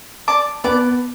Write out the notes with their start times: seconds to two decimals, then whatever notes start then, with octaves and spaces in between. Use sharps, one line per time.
0.28 D5 A5 D6
0.64 B3 D5 A5 D6